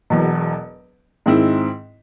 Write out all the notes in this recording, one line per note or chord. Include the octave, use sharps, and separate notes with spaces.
E1 E2 B2 F#3
G#2 D#3 G#3 C4 E4